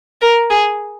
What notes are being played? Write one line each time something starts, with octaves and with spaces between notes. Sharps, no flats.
A#4
G#4